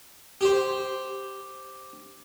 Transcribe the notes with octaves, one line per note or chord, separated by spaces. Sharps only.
G4 C5